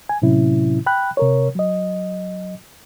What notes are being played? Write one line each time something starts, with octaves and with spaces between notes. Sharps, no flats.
G#5
A2 C3 F#3 C#4 E4
G5 B5 F#6
C3 A#4 C#5
F#3 D#5